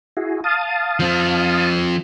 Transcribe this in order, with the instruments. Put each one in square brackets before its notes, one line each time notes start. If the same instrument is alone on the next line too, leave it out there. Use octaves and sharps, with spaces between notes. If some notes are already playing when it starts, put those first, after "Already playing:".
[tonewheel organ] E4 F#4 G#4
F5 A5 D#6
[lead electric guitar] F3 C4